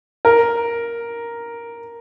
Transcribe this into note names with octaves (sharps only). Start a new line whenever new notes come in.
A#4